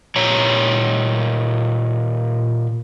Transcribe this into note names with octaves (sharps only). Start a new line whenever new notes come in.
A#2 G4 C#5 A#5